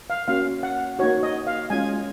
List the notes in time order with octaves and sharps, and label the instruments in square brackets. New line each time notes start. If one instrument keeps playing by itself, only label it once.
[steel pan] F5
A#3 C#4 F#4 F5
F#5
A#3 D#4 F#4 C#5
D#5
F5
G#3 C#4 F4 G#5